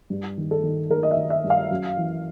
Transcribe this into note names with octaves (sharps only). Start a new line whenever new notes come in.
G2
D#3
A4
D#3
D#3 A#4
D#5
E5
D#3
E5
G2
F5
F#2
E3